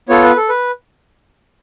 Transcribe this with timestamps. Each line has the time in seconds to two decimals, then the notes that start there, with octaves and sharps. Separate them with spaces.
0.09 B3 F4 A4 C#5
0.24 B4
0.37 A4
0.49 B4